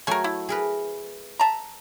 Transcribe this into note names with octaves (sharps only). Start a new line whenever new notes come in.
F#3 A3 A#4 G#5
E4
G#4 A#4 B4
E5 A5 A#5